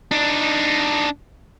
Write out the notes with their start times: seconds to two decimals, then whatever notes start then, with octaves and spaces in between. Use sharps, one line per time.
0.11 D4 D#4